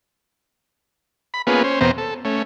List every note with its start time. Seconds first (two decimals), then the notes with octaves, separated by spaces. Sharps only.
1.34 B5
1.47 A#3 B3 C#4 F4 G#4 B4
1.64 C#4 C5
1.81 E2 B2 B3 C4 C5 A#5
1.98 A4
2.25 A3 C#4